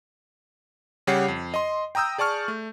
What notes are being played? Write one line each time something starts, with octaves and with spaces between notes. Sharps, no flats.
C#3 G3 G4 C#5 F#5 C7
F2
D#5 C6
G5 A#5 D#6 E6 G6
G#4 D5 A5 C#6 F6
A3